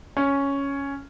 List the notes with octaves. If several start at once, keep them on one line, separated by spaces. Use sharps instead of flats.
C#4